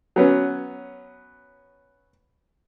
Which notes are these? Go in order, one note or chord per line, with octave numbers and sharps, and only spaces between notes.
F#3 B3 C#4